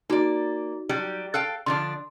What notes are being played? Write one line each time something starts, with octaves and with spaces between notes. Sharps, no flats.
A#3 D#4 F#4 D5
F#3 G3 G4
A4 F5 G5 F#6
D3 F3 D4 C6